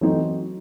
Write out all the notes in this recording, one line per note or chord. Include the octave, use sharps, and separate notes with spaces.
E3 F#3 A3 C4 D#4